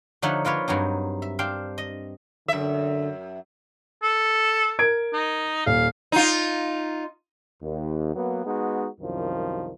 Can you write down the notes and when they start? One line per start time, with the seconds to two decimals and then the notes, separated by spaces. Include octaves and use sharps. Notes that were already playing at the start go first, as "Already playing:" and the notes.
0.22 D3 F3 D#4 C#5 E5 F#5
0.45 A#3 F4 B4 C#5
0.68 G2 F#3 C4 D#4
1.22 E5
1.39 C4 D4 F5 G5
1.78 D#5
2.48 F#2 D3 E5
4.03 A4
4.79 A#4 G#6 D7
5.13 D#4
5.66 D#1 F5
6.12 D#4 F4
7.62 D#2
8.16 F#3 A#3 B3
8.46 G#3 B3 D#4 F#4
9.01 C2 F#2 D#3 F3